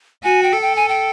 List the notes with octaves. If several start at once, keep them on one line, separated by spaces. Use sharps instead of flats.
F#4 G#5
G5
A4
G5
G#5
G5